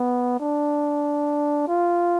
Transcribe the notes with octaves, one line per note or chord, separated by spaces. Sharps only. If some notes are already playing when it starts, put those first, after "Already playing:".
Already playing: B3
D4
F4